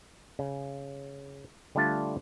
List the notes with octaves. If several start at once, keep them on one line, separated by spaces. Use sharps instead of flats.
C#3
D3 G3 A3 D4 F4 A5